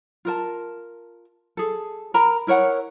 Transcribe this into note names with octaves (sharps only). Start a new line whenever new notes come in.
F4 A#4 A5
G#4 A4
A#4 A#5 B5
E4 A#4 C#5 F#5